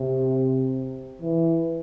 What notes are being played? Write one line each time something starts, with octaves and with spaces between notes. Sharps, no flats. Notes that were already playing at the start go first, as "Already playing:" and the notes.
Already playing: C3
E3